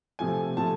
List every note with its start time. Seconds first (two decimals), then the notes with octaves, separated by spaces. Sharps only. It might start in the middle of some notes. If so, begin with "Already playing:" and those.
0.19 C3 F3 A3 G#5
0.57 C3 F3 A3 A5